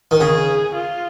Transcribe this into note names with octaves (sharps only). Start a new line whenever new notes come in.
D#3
C#3 G#4
F4